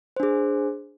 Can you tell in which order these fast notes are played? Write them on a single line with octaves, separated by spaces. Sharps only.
C5 D4 G#4